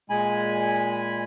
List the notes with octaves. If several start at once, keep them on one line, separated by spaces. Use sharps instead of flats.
A#2 G#3 G#5 B5